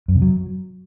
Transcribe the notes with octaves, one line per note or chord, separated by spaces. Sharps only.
F#2
C3
F#3